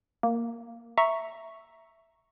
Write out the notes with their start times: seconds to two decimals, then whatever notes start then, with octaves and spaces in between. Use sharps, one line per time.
0.23 A#3
0.98 E5 A#5 C#6